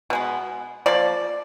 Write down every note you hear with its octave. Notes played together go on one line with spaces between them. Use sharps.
B2 G#3 B3
F3 A#3 D5